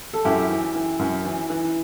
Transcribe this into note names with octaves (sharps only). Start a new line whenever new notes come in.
A4
F#2 E4 G4
E3
E3
F#2
E3
E3